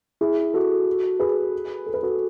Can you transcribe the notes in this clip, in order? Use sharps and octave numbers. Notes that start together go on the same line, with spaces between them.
E4 G#4
F#4 A4
G#4 B4
A4
B4
F#4 A4